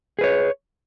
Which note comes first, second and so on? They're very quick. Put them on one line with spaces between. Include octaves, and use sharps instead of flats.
G#4 B4 C#5